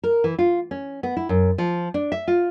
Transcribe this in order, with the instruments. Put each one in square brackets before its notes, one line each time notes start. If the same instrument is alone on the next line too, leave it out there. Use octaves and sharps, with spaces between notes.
[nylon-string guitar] A#4
E3
F4
C#4
B3
E4
F#2
F3
D4
E5
F4